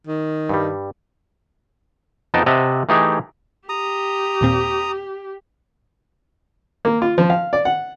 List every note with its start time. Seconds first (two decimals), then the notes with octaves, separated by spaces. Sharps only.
0.07 D#3
0.49 G2 G3
2.34 F2 B3 D#4 D#5 G5 A5
2.46 C3 D#5 E5 F#5 A5
2.89 E3 A3 D#4 G4 G#4
3.69 G4 A#5 D#6
4.41 D#2 A#2 C4
6.85 A#3
7.02 F4
7.18 F3
7.30 F5
7.53 D5
7.65 F#5